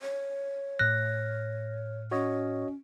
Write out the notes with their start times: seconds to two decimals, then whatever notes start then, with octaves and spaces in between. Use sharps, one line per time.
0.02 C#5
0.79 A2 F6 F#6 A#6
2.11 C#4 F#4 C#5 D#5